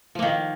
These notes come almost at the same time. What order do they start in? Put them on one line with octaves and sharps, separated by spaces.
F3 A#3 D#3